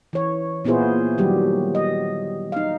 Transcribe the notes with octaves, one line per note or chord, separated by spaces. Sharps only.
E3 C#5
A#2 B3 E4 F4 G#4 C5
D#3 F#3 G3 G4
D#5
D#4 F5